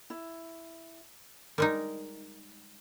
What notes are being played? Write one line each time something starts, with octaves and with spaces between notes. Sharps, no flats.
E4
G3 G#3 D#4 A#4